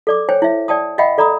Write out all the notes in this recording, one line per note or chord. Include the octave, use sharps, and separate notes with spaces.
A4 D5 D6
C5 C#5 G5 G#5
E4 E5
D5 G5 A5 D#6
D#5 E5 F#5 G5 B5
A4 D5 A#5 B5 D#6